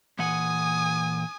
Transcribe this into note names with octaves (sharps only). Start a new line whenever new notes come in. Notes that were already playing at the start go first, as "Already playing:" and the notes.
A#2 E3 F#5 G#5 D#6